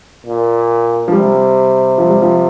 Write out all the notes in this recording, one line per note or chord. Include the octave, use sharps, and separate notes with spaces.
A#2
F3
C3 G3
F3
G3
F3